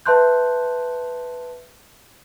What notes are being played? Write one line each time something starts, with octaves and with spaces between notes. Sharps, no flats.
B4 E5 A5 C6 F#6 G6